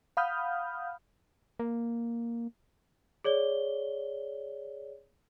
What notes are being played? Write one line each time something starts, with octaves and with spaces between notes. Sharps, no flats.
F5 F#5 B5 D#6 F6 G6
A#3
G#4 C#5 D5 G7